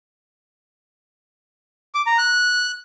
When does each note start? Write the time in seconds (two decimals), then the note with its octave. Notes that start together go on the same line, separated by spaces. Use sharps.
1.95 D6
2.06 A#5
2.18 F#6